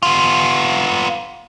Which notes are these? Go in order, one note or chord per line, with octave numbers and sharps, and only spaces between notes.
B3 F4